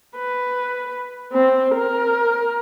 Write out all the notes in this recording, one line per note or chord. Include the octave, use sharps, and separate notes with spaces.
B4
C4
A#4